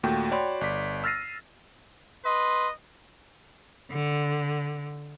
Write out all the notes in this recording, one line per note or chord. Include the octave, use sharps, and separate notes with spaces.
D#2 A#2 A3 F#4 G5
F#4 C#5 D5 G5 B5 C6
G1 D5 B6
E6 F6 A6 A#6 C7 D#7
B4 D#5 C6
D3